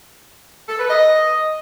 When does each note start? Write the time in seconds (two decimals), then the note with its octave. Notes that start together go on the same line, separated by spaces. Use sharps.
0.69 A4
0.79 B4
0.90 D#5